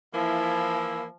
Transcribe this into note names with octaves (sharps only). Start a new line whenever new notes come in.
E3 F3 A#3 E4